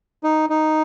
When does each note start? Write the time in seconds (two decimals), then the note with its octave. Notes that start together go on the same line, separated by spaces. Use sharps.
0.24 D#4
0.50 D#4